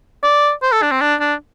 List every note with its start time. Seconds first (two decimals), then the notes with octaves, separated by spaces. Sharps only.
0.23 D5
0.63 C5
0.72 A4
0.82 D4
0.91 C4
1.01 D4
1.20 D4